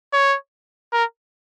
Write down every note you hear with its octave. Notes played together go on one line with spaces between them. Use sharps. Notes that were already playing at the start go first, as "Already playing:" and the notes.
C#5
A#4